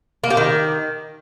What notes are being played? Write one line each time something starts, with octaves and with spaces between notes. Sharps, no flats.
A#3
G4
D#3